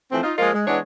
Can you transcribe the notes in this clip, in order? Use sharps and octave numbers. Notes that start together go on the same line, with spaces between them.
E3 F3 A3 C4
D#4 F4
F3 G#3 A#3 F4 A#4 D#5
G#3
E3 G#3 B3 D4 C#5